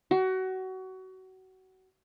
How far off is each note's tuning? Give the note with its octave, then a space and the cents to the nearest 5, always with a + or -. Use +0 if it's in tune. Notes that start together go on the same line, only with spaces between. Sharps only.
F#4 +25